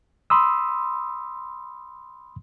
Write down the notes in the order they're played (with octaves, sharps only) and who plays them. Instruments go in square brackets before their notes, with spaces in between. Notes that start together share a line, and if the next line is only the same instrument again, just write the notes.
[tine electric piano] B5 C6 D#6 E6